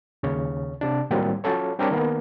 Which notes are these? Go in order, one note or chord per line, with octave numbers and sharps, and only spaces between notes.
D#2 C#3 C#5
C3 D4
A2 D#3 F#3 G3 A#3 C4
F#3 C#4 F4 A4 C#5
G3 C4 D4 G4 A#4 C#5
D#3 A#3 B3 A#4